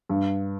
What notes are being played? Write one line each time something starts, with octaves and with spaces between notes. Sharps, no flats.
G2